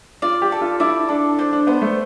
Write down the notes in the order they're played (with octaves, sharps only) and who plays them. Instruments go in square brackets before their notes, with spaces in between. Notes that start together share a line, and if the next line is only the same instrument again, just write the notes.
[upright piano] F4 [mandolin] D5
[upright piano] G4
[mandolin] A4
[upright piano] F4
[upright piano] E4 [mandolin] D5
[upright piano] D4 [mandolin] A4
[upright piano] D4 [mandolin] C5
[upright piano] D4
[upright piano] B3 [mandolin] C5
[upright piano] A3